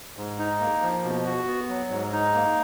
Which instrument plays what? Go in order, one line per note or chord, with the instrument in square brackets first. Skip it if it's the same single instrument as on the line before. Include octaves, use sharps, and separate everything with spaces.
[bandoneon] G#2
D#4
A#3
F3
B2
F#4
B3
F#3
G#2
D#4
A#3